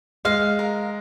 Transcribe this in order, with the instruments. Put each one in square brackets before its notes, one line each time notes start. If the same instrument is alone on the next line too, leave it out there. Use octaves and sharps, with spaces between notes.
[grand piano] G#3 [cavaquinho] F5
[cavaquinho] A#4